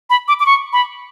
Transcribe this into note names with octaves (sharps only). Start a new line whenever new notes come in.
B5
D6
D6
C#6
B5